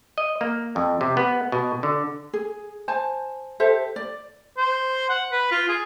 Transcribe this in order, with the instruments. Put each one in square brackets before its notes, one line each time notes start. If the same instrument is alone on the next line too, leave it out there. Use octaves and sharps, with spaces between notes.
[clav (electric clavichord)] D#5
A#3
F2
C3
B3
B2
D3
[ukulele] G#4
C5 G#5 A5
G4 A4 C5 E5
D5
[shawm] C5
F#5
B4
F4
G#4